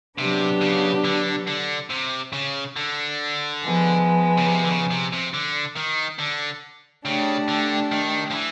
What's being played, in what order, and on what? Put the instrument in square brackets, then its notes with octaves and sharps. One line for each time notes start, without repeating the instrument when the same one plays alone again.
[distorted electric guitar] C3 [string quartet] F#3 B3 D4 G4 B4
[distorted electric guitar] C#3
D3
D3
C3
C#3
D3
[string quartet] F3 G#3 B3
[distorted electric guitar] C#3
C3
D3
C#3
C3
C3
D3
D#3
D3
[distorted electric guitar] C#3 [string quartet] A3 D4 G4
[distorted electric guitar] D3
D#3
F3
E3